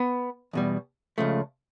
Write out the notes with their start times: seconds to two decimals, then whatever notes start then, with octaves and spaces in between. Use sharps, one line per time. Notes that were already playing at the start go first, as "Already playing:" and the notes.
Already playing: B3
0.53 E2 B2 G3
1.18 C#2 C#3 F3 A3